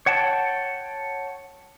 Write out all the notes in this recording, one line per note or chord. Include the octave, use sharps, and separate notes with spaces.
C#5 F#5 G5 A5